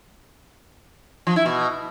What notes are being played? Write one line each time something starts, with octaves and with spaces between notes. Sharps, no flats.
F3
E4
B2